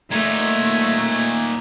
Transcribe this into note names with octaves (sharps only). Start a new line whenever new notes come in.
A#2 A3 D#4 G#6